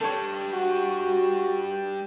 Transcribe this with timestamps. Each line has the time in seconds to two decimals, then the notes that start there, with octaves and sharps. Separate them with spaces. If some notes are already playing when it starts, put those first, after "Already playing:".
0.01 G3 D4 A4 C#5
0.53 F#4